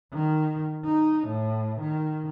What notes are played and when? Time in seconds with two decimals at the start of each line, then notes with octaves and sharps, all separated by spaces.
0.13 D#3
0.85 D#4
1.27 A2
1.81 D#3